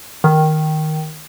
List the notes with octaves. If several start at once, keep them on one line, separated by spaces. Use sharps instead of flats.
D#3